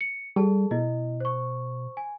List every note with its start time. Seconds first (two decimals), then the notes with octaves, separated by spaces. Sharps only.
0.01 C#7
0.36 G3 G#4 A4 A5
0.71 B2 E4 D#5
1.20 C5 C#6
1.97 G#5